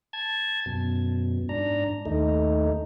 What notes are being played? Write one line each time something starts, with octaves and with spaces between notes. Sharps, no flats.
A5 G#6
F#2 B2
G#2 D4 A#5
D#2 A3 D#4